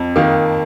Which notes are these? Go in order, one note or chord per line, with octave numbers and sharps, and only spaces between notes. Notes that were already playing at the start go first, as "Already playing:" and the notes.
Already playing: F2
D#3 A#3